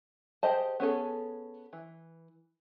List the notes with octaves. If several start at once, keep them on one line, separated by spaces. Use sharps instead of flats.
G4 G#4 C5 D#5 A5
B3 C#4 G#4 A4
E3